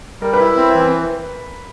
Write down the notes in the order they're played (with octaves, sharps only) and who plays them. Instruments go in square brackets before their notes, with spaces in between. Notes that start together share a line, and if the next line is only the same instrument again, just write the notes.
[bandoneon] G3 [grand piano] A#4
[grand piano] B4
[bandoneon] E4
C4
E3